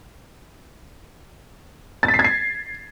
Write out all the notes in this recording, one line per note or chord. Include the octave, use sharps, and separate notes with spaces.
A6
B6
C7
G#6
C7